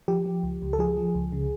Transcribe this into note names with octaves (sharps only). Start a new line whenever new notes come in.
F3 G4
F3
C#2
C#2
A4
F3 G#4
F3
C#2
C#3